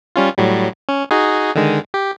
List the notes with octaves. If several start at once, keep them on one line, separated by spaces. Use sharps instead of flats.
G3 C#4 F4
A2 F#3 G3
C#4
D#4 F#4 G#4
D3 D#3 G#3
G4